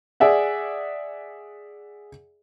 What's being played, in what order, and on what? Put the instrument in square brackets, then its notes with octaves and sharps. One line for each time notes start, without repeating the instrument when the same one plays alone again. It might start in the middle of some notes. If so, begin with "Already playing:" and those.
[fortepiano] G#4 D5 E5 F#5